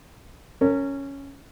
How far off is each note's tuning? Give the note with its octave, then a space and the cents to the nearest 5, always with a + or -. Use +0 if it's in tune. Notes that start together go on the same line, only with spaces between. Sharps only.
C#4 +0 A#4 -30